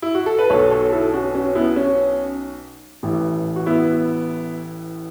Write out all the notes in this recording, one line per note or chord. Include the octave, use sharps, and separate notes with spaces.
E4
F#4
A4
B4
B1 B2 F#3 A4 C#5
A4 C#5
E4 A4
C#4 F#4
C#4
B3 E4
C#4
A1 A2 E3
F#4
B3 E4